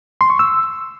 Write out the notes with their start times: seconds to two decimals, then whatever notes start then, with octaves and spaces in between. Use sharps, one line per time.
0.21 C6
0.30 C#6
0.39 E6